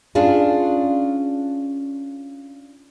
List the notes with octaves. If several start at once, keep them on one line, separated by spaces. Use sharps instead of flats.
C#4 D4 F4 G#4